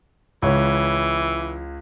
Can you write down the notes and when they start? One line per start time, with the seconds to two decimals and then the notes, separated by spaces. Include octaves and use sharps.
0.42 C#2 E3 C#5